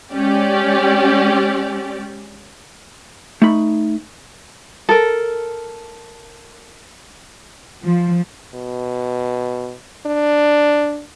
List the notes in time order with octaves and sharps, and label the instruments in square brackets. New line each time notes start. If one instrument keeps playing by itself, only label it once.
[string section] G#3 C#4 G4 D5
[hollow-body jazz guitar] A3 D#4 B5
[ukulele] A4 A#4
[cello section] F3
[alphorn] B2
D4